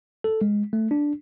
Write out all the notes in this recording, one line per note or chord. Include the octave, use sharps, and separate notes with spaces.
A4
G#3
A3
D4